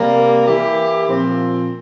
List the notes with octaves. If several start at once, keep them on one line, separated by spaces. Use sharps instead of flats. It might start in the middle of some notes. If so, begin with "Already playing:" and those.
Already playing: C3 G3 A#3
E3 A#3 E4 G4
A#2 F3 C4